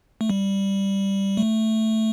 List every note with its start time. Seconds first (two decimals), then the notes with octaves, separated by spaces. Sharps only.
0.21 A3
0.30 G3
1.37 A3